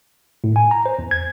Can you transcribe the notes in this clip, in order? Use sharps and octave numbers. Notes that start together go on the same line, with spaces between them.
A2
G#5
A#5
C5
E2
G#6